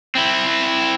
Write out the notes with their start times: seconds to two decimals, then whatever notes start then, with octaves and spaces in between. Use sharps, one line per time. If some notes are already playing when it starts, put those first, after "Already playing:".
0.15 C4 E4